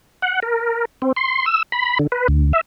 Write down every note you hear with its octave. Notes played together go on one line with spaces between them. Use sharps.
F#5
A#4
C4
C6
E6
B5
D3
B4
D2
E5